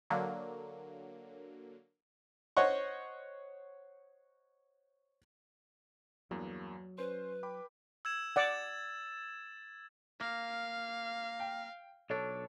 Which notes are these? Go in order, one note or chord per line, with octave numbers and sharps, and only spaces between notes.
D3 F#3 A#3
C5 C#5 D#5 F#5 C#6
E2 G2 F#3 A#3
C#4 B4 C5 C6
G5 B5 D6
E6 G#6 E7
D5 F#5 G#6 A6 E7
A#3 F5
G5
B1 D4 A4 C#5